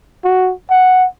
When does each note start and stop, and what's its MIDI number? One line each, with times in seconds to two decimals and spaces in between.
0.24 0.52 66
0.71 1.06 78